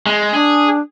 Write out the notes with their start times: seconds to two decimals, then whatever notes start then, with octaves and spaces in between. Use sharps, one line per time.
0.06 G#3
0.33 D4 G#4